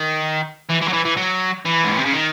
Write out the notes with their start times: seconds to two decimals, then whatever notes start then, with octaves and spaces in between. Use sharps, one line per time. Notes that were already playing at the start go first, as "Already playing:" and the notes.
Already playing: D#3
0.69 E3
0.81 E3
0.88 F#3
0.93 E3
1.05 E3
1.17 F#3
1.65 E3
1.84 G#2
1.91 A2
1.98 C3
2.05 C#3
2.12 D#3